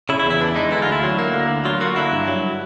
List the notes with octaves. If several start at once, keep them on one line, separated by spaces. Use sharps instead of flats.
C#3 E4
E4
E2
E4
E3 D4
G#3 D#4
D3 E4
F4
D2
E4
F#3
A#3
D3
D2
F#3 F4
A#3 F#4
D3 E4
G2
F#3